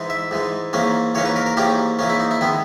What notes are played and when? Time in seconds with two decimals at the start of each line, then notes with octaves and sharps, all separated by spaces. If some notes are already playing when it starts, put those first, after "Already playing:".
Already playing: G#2 E3 G#3
0.10 E5
0.31 G#2 E3 G#3
0.73 G#2 E3 A#3 C#4
1.15 G#2 E3 A#3 C#4 C#5
1.26 B4
1.36 A#4
1.46 A#4
1.57 G#2 E3 A#3 C#4 G4
1.99 G#2 E3 A#3 C#4
2.10 E4
2.20 D#4
2.31 E4
2.41 D#3 G#3 B3 E4